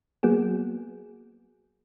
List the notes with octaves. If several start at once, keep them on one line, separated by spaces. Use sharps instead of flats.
F#3 A#3 B3 F#4 G#4